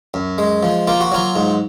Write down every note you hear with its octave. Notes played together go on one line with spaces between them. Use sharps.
F#2
G#3
F3
A#3 F4
F#4
F#3 F4
G#2